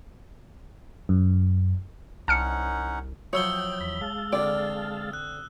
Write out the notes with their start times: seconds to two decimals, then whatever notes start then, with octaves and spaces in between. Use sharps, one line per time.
1.09 F#2
2.28 C2 C#4 D#4 F#5 A5 F6 C#7
3.33 F3 F#3 E4 C#5 G5 D#6 E6 G7
3.80 E2 B5
4.01 G#3 F5 A5
4.32 D3 C4 D5
5.13 F#6